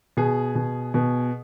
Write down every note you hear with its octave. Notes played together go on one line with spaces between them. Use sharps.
B2 G#4
B2
B2